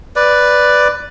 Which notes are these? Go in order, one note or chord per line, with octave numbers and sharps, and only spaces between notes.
B4 D5